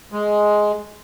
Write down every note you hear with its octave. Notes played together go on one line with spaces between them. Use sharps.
G#3